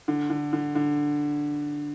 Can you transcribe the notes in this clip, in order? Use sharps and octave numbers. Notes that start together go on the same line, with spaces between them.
D3
D3
D3
D3